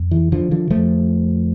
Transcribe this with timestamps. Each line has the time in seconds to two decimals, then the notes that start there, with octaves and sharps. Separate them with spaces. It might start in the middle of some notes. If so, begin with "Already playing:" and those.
Already playing: F2
0.11 E3
0.32 D3 F3
0.51 D3 F3
0.70 F2 D3 F3 A3